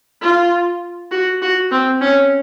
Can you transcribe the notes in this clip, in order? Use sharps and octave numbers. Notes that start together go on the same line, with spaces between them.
F4
F#4
F#4
C4
C#4